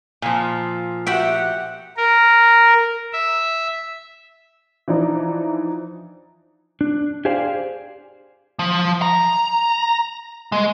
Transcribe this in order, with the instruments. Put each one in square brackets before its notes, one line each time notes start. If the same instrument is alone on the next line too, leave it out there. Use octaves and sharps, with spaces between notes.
[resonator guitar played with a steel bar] A#2 F3
[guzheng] F#4 E5 G5 [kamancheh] G4 F#5
[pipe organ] A#4
E5
[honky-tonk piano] E3 F3 D4 D#4
[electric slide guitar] D4
G4 G#4 C5 D5 F5
[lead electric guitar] F3
A#5
G#3